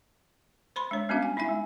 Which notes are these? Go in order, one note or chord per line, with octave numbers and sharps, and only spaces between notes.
C5 B5 C6
G#3 D4 C#5
G3 B3 C#4 D4 F#4 F5
G#5
D#4 E4 E5 G#5
G#3